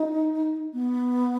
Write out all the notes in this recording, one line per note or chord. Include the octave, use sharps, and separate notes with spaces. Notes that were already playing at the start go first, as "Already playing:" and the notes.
Already playing: D#4
B3